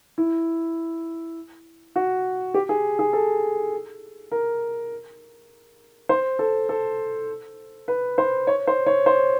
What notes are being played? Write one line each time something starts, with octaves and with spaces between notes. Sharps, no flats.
E4
F#4
G4
G#4
G#4
A4
A#4
C5
A4
A4
B4
C5
C#5
C5
C#5
C5